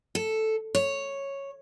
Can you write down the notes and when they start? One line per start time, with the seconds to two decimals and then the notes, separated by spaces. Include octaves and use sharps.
0.15 A4
0.75 C#5